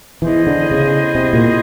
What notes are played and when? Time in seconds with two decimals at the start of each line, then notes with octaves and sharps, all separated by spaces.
0.22 E3 B3 E4 G#4 C5 D#5
0.47 D3
0.71 C#3
1.15 C3
1.33 A#2